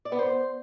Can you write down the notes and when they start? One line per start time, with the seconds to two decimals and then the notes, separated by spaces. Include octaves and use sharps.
0.05 D5
0.12 B3
0.19 C5